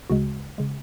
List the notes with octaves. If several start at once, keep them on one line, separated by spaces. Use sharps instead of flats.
D2 C#3 G#3 F#4
C#3 G#3